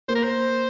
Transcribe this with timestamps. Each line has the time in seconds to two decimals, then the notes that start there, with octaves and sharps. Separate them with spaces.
0.08 A#3 C5
0.15 A#4
0.23 C5